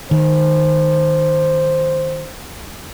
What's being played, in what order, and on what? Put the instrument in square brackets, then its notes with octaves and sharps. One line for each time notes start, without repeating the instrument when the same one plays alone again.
[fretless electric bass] D#3 [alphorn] C5